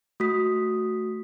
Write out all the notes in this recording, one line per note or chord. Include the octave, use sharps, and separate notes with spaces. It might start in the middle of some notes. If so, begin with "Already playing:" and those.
A3 F#4 D#6 B6